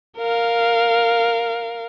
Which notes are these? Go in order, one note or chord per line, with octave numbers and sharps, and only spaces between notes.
A#4 F5